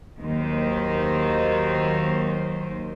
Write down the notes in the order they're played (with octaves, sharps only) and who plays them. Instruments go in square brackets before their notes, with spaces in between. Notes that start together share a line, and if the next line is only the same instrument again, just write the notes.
[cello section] D#2 D#3 F#3 C5